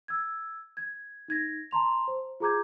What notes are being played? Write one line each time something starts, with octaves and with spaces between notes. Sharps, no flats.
E6 G#6
G#6
D#4 G#6 A#6
A5 A#5 C6 F7
C5
F4 G#4 A#5 D6 G6 G#6